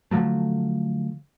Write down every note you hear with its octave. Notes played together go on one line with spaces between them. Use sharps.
D3 F3 F#3 A3